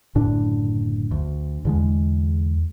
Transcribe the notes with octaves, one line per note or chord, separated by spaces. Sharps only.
F#1 A2 D3 D4
D2
E2 D3 G#3